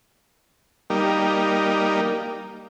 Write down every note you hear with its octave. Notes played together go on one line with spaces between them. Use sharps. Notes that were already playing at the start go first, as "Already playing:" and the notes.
G3 A#3 D#4